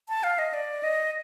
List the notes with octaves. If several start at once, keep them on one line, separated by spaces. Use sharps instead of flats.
A5
F5
D#5
D5
D#5